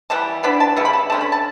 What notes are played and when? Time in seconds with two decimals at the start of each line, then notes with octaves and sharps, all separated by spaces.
0.10 E3 G3 B3 A5
0.43 E3 B3 D4 B5
0.60 A5
0.76 C#3 G3 B3 E4
0.85 B5
0.93 A5
1.10 D3 A3 C#4 A5
1.21 B5
1.32 A5